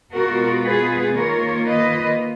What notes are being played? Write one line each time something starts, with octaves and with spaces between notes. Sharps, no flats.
B2 G#3 B3 F4 F#4 A#4
G#4 B4
D#3 A#3 F4 A#4 C#5
B4 D#5